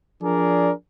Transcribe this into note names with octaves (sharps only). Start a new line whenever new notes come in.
F3 D4 G#4 A#4 D5